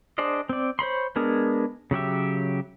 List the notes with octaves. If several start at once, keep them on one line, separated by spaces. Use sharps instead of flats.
D4 G#4 C5 D5 D#5
C4 D5
C5 C#5 B5 C6
G#3 B3 D4 G#4 A#4
C#3 F#3 G4 E5